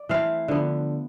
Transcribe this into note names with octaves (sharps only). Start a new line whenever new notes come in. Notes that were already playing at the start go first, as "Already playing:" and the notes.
Already playing: D5
E3 A3 C4 F5
D3 F3 B3